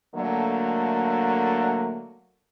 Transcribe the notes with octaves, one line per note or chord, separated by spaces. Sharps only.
D3 F#3 A3 A#3